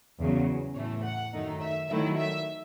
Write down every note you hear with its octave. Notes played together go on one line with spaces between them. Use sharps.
E2 C#3 F#3
A2 E3 A3 C#5
F#5
F#2 D#3 A3 D#4
E5
D#3 F#3 A3 E4 E5
E5